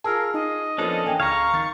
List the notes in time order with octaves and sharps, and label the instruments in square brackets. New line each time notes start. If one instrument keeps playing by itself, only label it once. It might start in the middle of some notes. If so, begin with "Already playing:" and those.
[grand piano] F4 G#4 [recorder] A#4 [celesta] A5 E6 F6
[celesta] D#4 [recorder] D#5
[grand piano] F3 A#3 B3 [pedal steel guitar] C#4 D4 A4
[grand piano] E3 A#3 [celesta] G5 G#5
[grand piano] C#2 [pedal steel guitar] F5 A#5 [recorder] C#6 [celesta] G#6
[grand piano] D#3 A6